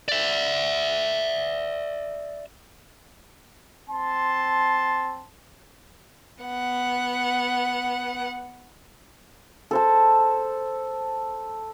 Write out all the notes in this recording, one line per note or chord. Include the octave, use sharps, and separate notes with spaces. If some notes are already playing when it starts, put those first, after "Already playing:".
D5 E5
C4 A5 C6
B3 F#5
A4 C5 A5